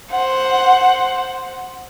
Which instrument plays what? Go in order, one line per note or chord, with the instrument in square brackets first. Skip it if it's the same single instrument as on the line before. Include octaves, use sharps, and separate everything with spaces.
[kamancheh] C5 F#5